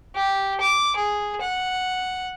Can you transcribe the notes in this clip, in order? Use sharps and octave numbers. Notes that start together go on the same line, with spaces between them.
G4
D6
G#4
F#5